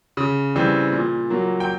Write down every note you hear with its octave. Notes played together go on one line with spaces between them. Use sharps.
C#3
E3 G3 C4
A#2
F#3 A#3
G5